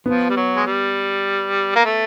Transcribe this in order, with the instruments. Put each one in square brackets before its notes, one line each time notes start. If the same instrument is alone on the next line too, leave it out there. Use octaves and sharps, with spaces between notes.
[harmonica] F3 [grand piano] B3
[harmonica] G3
F#3
G#3
G3
A#3
A3